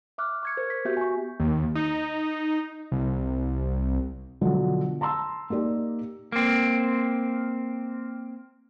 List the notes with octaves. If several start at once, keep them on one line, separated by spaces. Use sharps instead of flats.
E5 D6 F6 F#6
C#6 G#6 C#7
A#4 C5 G#6
B6
B3 F#4 G4 E5 G6
G#5 C#6
D#2
D#4
C2
B2 D3 F3 F#3
A5 A#5 C6 E6
A#3 D#4 G4 D5
A#3 C4